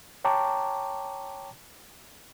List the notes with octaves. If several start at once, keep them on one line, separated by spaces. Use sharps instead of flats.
C#5 G5 A5 A#5 C#6 D6